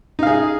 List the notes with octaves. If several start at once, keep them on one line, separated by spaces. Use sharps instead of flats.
D#4 G#4 F5